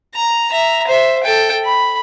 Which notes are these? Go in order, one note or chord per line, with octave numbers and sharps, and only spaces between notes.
A#5
E5 A#5
C5 E5
A4 G5
B5